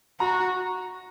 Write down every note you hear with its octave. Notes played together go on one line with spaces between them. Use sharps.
F#4 A#5